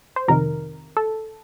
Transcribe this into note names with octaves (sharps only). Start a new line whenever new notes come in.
C5
F2 C3 D#3 A#4
A4